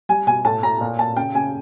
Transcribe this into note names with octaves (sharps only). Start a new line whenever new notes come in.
G3 G#5
B2 G#5
A2 A5
A2 A#5
A#2
A#2 A5
C#3 G5
C#3 G#5